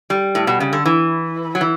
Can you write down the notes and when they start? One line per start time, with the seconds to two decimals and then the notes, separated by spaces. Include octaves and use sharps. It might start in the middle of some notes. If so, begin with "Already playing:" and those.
0.10 G3
0.35 A2
0.47 B2
0.60 C#3
0.73 D3
0.85 E3
1.55 F#3
1.61 E3